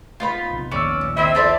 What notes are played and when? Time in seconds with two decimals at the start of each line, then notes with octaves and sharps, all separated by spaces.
0.20 B3 D#4 F4 B5
0.50 B1 C3
0.72 A#1 D#2 C#4 D5 E6
1.01 A#2
1.17 D#3 C4 E4 C5 D#5 E5
1.35 D4 F4 A4 C5 D5